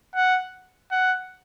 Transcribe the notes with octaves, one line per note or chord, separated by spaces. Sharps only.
F#5
F#5